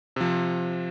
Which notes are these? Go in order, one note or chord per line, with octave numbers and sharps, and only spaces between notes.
C3 F3